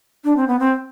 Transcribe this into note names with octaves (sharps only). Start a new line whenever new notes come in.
D4
C4
B3
C4